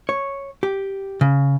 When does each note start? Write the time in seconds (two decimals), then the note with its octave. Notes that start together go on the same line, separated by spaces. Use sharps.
0.09 C#5
0.63 G4
1.21 C#3